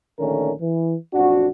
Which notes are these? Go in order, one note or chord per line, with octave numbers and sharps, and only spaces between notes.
A#1 D3 D#3 A3 C#4 A#4
E3
A1 F2 D4 F#4